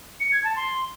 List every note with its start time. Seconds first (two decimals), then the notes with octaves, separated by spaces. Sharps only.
0.20 C#7
0.32 G#6
0.44 A5
0.56 C6